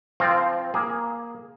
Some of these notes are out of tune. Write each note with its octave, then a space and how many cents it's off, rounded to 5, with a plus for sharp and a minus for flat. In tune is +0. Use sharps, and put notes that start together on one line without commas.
F3 -20 C4 +0 F5 +0
A#3 +10 G#4 +0 A#5 +40